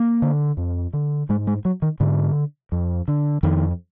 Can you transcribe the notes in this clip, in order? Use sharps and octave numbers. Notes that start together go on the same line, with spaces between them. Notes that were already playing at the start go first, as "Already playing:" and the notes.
Already playing: A#3
D3
F2
D3
G#2 G#3
G#3
F#3
D#3
G#2 D3
F2
D3
F2 D#3